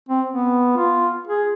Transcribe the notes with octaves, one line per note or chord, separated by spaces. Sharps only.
C4
B3
F4
G#4